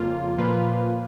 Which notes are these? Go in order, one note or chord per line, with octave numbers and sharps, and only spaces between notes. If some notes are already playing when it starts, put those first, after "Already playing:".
Already playing: F2 C#3 F3 A#3 F4
A#2 F3 A#3 F4 B4